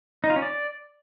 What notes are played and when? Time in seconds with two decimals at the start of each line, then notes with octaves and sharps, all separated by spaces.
0.24 D#4
0.30 F4
0.36 C#4
0.42 D5